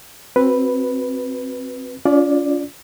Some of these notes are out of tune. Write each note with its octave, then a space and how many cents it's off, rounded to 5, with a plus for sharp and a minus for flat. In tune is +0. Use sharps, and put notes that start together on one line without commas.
C4 +15 F#4 +0 B4 +0
C#4 +45 F4 +0 D5 +5